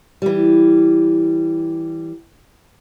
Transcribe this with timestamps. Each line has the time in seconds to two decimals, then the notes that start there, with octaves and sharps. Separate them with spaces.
0.22 E3 G3